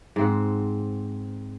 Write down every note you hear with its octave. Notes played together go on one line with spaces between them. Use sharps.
G#2 C4 F#5